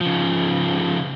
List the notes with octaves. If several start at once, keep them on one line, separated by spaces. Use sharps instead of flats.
C#3 F3